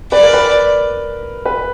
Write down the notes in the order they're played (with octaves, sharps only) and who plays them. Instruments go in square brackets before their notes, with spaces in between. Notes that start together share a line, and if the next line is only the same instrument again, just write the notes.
[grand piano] B4 [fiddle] D5
[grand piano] A#4
B4
B4